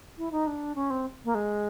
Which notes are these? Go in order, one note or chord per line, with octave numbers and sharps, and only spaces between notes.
E4
D#4
D4
C#4
C4
A#3
G#3